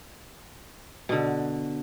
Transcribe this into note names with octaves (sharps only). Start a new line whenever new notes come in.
B2 D3